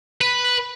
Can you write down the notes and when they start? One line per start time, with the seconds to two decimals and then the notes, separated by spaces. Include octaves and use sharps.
0.21 B4